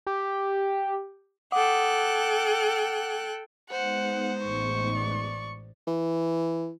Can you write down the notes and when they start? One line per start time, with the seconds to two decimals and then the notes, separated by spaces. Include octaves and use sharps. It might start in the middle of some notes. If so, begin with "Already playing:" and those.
0.07 G4
1.52 A4 F#5 G5 D6 D#6 F#6
3.71 G#3 B3 D#4 C5 F#5
4.45 A1 A2 C#6
4.96 D5
5.87 E3